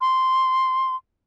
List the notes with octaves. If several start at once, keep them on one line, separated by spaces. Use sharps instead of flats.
C6